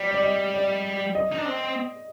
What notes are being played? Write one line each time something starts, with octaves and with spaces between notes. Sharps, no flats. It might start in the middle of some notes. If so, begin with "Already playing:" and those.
Already playing: G3 D5
D5
D#5
D5
D#5
D#4
D4
C4